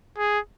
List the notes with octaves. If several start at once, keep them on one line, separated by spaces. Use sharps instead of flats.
G#4